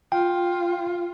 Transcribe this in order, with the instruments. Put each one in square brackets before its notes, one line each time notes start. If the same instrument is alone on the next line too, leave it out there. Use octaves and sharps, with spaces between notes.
[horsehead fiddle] F4 [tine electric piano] G5